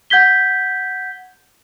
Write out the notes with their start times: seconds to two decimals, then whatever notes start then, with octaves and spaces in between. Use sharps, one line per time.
0.10 F#5 G6 G#6 B6 G7